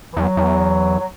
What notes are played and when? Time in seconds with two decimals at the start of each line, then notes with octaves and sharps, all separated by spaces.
0.12 E3
0.17 E2 F#3
0.37 E2
0.99 F#3